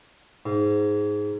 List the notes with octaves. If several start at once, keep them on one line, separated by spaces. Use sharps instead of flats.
G#2